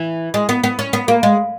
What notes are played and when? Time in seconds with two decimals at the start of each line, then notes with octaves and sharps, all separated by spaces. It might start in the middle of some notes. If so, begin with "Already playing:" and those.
Already playing: E3
0.34 G#3
0.49 B3
0.64 B3
0.79 C#4
0.93 B3
1.08 A#3
1.23 G#3